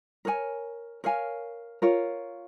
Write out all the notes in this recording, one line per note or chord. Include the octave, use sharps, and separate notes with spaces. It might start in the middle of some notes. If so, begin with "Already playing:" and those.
A#4 C#5 G#5
A#4 C#5 F5 G#5
F4 A#4 C#5 F5